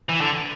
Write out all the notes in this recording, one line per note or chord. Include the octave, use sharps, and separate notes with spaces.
E3
D3